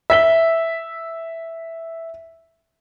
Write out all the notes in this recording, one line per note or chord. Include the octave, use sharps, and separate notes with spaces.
E5 B6 G7